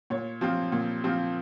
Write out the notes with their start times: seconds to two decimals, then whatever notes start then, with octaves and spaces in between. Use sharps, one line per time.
0.10 A#2 C#5
0.41 F3 C4 F4
0.72 A#2
1.04 F3 C4 F4